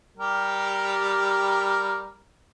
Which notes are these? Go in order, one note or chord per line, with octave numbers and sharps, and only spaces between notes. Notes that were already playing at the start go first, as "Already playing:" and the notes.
G3 G4 A#4